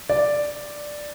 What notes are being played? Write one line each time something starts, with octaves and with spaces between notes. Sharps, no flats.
D5